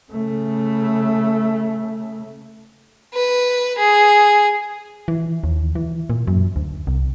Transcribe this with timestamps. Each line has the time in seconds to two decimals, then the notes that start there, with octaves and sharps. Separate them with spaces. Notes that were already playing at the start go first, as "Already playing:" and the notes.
0.12 C#3 A3
3.14 B4
3.78 G#4
5.08 E3
5.44 D#2
5.75 E3
6.10 A#2
6.27 F#2
6.56 D2
6.87 C2